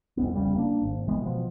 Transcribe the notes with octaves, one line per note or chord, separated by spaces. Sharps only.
C2 F2 B3
F1 C#3 G3
A#3 C#4 D4
G#1
C3 E3 G#3 B3
B2 F3